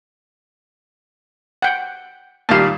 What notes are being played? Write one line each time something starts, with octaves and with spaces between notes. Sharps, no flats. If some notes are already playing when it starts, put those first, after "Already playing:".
F#5 G5
A#2 D#3 G3 F5 A5